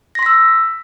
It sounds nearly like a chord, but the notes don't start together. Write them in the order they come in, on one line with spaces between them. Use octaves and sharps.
A#6 C6 B6 E6